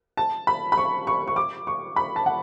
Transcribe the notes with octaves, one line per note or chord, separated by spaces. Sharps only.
A5
B5
B5
C#6
C#6
C#6
D6
C#6
B5
A5
F#5